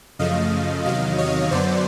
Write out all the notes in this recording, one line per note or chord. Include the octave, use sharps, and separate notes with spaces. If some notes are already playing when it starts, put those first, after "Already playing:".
F#2 C#3 F3 A3 D#5 F5
E2 C3 D#3 F#3 D#5 F5
C#5 D#5
F#2 D3 F#3 B3 C5 D5